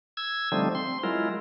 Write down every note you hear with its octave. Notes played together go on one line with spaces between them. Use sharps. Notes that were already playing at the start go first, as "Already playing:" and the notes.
E6 G#6
D3 F3 G3 A3 C4 D#4
C4 C6
F#3 G#3 E4 F4 A#4